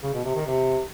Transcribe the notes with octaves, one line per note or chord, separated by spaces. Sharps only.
C#3
B2
C3
D#3
C3